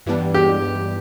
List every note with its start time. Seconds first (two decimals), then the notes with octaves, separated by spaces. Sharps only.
0.06 G2 E3 G3 B3 D4
0.34 G4